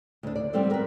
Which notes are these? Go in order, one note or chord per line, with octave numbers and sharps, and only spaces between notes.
D2 D4
D5
G3 B3 C4 A4 D5
A#4 B4